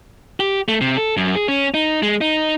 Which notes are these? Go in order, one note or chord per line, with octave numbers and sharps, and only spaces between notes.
G4
A3
C3
A4
F#2
G#4
C#4
D#4
G#3
D#4